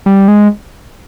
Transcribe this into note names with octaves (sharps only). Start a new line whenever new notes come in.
G3
G#3